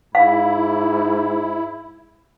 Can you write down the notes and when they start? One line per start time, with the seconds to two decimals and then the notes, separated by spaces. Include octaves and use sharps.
0.15 G#2 E4 F5